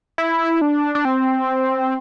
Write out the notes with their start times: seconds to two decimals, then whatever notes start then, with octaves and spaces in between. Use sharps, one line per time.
0.18 E4
0.61 D4
0.95 D4
1.05 C4